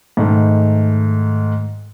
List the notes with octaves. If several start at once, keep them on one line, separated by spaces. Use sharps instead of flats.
G#2 D#3 A3